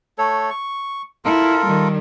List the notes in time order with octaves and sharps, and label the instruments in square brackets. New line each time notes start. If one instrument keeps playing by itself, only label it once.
[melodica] A3 A4 C#5
C#6
[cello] E4 [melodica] F4 A4 A#4
[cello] D#3 G3